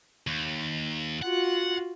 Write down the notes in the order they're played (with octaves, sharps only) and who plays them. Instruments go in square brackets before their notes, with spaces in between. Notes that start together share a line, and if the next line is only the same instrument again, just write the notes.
[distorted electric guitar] D#2
[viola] F4 F#4 [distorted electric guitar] F#5